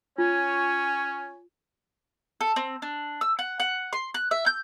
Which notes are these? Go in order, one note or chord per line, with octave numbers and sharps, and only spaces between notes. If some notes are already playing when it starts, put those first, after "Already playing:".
C#4 F4 C#5 G#5
A4
C4
D4
E6
F#5
F#5
C6
F#6
E5
G6